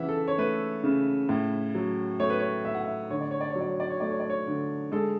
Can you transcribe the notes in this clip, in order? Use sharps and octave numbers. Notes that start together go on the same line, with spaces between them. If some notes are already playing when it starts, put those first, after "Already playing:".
Already playing: C#3 E3 E5 F#5
A4
C#5
A3 B4
C#3
A2
F#3
A3 C#5
B4
C#5
A2 E5
F#5
E5
D3 C#5
D5
C#5
D5
C#5
F#3
D5
C#5
D5
C#5
A3 D5
C#5
D5
C#5
D3
G#3 A4